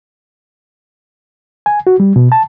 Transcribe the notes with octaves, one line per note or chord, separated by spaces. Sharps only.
G#5
F#4
G3
B2
A5